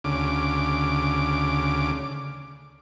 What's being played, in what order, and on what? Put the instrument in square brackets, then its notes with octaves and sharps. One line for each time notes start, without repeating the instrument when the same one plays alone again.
[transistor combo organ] D2 C#3 D6